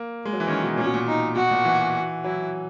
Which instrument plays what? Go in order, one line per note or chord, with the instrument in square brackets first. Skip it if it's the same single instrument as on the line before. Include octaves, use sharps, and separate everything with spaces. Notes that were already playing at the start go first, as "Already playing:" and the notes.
Already playing: [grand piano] A#3
G#3
F#3
E3
[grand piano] D#3 [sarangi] C#4
[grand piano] B2
[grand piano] A#2 [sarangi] C#4
[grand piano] B2
A#2
[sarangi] D#4
[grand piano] B2 [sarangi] F#4
[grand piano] A#2
E3
[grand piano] F#3 [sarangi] E4